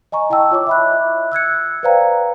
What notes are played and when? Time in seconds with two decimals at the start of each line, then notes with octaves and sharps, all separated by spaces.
0.12 D#5 G#5 A#5 C#6
0.30 E4 D#5 G5 A5 E6
0.51 F4 C#5 D#5 D6
0.67 E5 B5 F#6
1.32 E6 F#6 G#6 C#7
1.83 B4 C5 D5 F5 G5 A#5